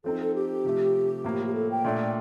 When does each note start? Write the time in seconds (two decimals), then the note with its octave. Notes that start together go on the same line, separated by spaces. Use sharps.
0.04 F3 C4 D#4 A4
0.20 A4
0.34 G4
0.64 C3 F3 A3
1.24 A2 F3 A#3
1.46 G4
1.54 A4
1.70 G5
1.84 A#2 A3 D4